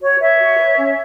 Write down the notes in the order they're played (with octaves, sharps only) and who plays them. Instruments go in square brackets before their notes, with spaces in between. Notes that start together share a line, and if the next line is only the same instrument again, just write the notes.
[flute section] F#4 C#5
B4 C#5 E5
F#4
B4
C#4